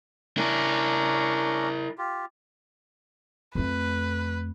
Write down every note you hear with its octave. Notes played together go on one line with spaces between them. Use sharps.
C#4 D4 E4 A#4 A#5
F4 G4
F2 A3 B4